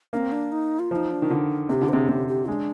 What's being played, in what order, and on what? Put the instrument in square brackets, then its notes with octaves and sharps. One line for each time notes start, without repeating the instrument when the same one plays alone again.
[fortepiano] A#3 [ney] D4
[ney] C4
D4
D#4
F4
[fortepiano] F3 [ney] F4
[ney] D#4
D4
[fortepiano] D#3
D3
[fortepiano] C3 [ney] G#4
[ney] G4
[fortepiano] D3
[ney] C5
[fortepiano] C3 [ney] G#4
[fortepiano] C3 [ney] G4
[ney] G4
[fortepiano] G#3 [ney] D4